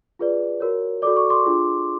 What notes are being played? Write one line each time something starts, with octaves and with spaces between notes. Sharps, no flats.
F4 G#4 B4 D5
F#4 A#4 C#5
F#4 A4 D5 D6
C#6
C6 D6
D4 F4 G#4